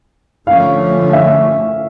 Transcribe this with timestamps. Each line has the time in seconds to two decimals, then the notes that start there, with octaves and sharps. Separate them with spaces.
0.47 D3 F3 A3 C#4 F5
1.13 E5